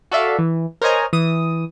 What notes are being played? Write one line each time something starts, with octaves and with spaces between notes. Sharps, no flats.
F#4 A4 D5 E5 F5
E3
A#4 C5 C#5 D#5 G#5 A#5
E3 D#6